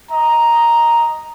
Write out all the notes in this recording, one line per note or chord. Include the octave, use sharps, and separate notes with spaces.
D#5 A#5